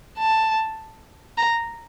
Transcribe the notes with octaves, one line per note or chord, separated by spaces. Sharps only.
A5
A#5